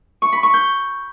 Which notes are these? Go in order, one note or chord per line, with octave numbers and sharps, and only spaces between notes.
C#6
B5
C#6
G6